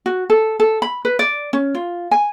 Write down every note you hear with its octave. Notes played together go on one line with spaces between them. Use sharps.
F#4
A4
A4
B5
B4
D5
C#4
F4
G#5